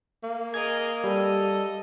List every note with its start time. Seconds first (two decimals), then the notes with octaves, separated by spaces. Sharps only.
0.24 A#3
0.54 G#4 A#4 D#5 G#6
1.04 G3 A4 D#5